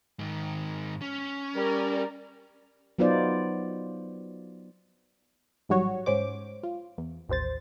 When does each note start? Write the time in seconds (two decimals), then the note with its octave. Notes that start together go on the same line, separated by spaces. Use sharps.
0.19 G#2 D#3
1.02 C#4
1.55 G3 A#4 D5
2.98 F#3 B3 D#4 F4 C5 D5
5.69 A1 G#2 F#3 G3 F#4 C#5
6.06 G#2 C#4 C5 D6
6.63 F4
6.98 E2
7.29 A1 D#2 C5 A6